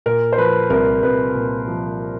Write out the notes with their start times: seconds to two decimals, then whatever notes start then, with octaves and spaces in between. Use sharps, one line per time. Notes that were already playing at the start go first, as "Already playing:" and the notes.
0.06 A#2 A#4
0.33 C5
0.38 F3 B4
0.70 C2 A#4
1.03 C2 B4
1.35 A#2
1.67 F3